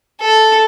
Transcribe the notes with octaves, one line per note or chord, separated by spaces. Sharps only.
A4